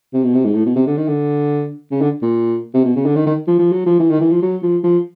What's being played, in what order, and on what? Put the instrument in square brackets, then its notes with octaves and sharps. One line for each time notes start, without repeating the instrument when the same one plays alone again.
[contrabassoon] C3
B2
C3
G#2
A2
B2
C3
D3
D#3
D3
C#3
D3
A#2
C3
B2
C#3
D3
D#3
D#3
F3
F3
F#3
F3
E3
D#3
E3
F3
F#3
F3
F3